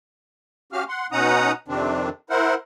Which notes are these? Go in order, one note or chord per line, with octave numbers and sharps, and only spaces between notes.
C#4 F#4 G4 F5 F6
F#5 C6
B2 C#4 D#4 F#5 A#5 D#6
F2 C3 D#3 C4 D4
E4 A#4 C5 F#5